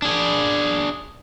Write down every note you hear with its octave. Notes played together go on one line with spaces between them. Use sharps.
D4 G#4